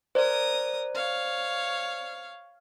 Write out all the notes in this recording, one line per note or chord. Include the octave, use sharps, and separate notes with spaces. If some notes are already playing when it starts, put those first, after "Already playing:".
A#4 C5 D5 D#6
C#5 F5